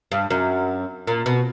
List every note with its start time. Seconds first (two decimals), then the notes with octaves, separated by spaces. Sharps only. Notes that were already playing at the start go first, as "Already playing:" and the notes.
0.12 G2
0.31 F#2
1.07 A#2
1.26 B2